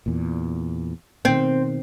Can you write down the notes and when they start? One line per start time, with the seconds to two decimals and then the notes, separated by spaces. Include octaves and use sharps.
0.06 E2 A#2
1.25 B2 D#3 C4